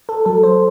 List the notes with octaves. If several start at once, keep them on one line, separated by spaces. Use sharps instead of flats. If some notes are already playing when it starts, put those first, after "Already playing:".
A4
F#3 A4
C5